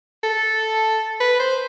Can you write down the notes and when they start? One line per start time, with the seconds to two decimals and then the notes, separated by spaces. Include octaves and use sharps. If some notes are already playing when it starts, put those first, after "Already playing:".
0.23 A4
1.20 B4
1.40 C5